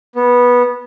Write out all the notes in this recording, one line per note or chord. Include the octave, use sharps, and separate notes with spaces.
B3